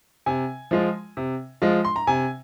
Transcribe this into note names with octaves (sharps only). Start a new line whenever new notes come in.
C3 G#5
F3 G#3 F4
C3
F3 G#3 F4
C6
A#5
C3 G#5